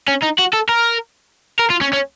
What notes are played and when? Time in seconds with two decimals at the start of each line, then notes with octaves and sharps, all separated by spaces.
0.08 C#4
0.23 D#4
0.39 F#4
0.53 A4
0.69 A#4
1.59 A#4
1.70 F4
1.81 C#4
1.93 C#4